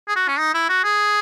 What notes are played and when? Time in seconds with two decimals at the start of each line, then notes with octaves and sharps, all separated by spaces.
0.08 G#4
0.16 F#4
0.28 C#4
0.39 D#4
0.54 E4
0.69 F#4
0.84 G#4